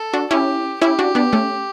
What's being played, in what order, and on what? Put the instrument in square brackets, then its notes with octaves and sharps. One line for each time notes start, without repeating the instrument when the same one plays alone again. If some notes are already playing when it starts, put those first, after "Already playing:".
Already playing: [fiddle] A4
[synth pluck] D4 F#4
[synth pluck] C#4 E4 [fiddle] G4
[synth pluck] C#4 E4 [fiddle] G4
[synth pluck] D4 F#4
B3 D4
A3 C#4